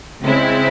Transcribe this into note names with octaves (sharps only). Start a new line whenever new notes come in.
C#3 G#3 C4 E4